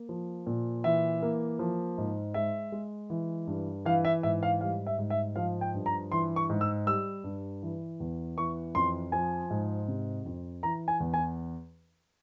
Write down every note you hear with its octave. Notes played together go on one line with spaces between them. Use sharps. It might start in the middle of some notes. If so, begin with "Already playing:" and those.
Already playing: A#3
F3
A#2
E3 E5
A#3
F3
G#2
G#3 E5
G#3
E3
G2
E3 F5
E5
G#2 E5
F5
G3 F5
E5
G#2
E5
F3 F5
G5
G2
A#5
E3 C6
C#6
G#2
E6
G3 E6
G2
E3
E2
E3 C#6
F2 C6
F3 G#5
G#2
C3
F2
E3 A#5
G#5
E2
G#5